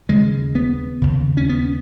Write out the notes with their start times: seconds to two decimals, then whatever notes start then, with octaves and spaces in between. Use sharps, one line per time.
0.09 D#2 C#3 G#3
0.55 B3
1.02 D#2 C#3
1.37 C#4
1.49 B3